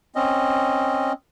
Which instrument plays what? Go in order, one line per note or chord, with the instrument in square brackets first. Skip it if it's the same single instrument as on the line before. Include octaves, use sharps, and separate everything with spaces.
[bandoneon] C4 C#4 D#5